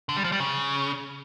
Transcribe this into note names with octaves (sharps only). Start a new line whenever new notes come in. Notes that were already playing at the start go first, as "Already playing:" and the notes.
D3
G3
F3
G3
C#3